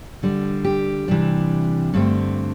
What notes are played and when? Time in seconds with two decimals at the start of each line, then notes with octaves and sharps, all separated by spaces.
0.23 D3 G3 D4
0.64 G4
1.08 C3 E3 G3 D4
1.94 G2 D3 A3 C4